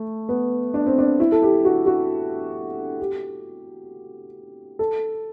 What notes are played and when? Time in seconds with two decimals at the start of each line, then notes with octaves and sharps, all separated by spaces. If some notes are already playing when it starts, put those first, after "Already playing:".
Already playing: A3
0.29 B3
0.74 D4
0.86 C4
0.98 D4
1.20 E4
1.32 A4
1.42 G4
1.65 F#4
1.86 F#4
3.00 G4
4.79 A4